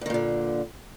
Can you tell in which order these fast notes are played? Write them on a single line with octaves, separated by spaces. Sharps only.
G2 D#3 A#2 D3